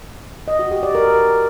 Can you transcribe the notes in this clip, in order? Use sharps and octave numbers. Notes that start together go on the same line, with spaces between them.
D#5
F#4
G4
D5
A#4